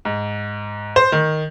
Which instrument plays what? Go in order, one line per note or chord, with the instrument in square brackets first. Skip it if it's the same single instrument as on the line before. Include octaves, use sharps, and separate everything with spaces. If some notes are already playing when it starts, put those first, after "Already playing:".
[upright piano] G#2
C5
D#3